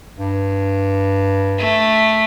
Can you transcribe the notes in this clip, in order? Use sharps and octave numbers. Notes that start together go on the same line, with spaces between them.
G2
A3